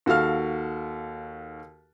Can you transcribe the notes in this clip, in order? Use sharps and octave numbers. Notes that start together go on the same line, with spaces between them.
D#2 F#4 A4 F5 F6